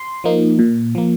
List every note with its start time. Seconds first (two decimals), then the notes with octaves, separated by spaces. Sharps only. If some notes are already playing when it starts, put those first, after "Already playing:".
Already playing: C6
0.24 F3 A#3 D#4
0.59 A#2
0.95 F3 A#3